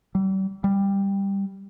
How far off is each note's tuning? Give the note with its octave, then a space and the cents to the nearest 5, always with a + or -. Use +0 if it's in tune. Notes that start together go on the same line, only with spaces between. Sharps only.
G3 -40
G3 +10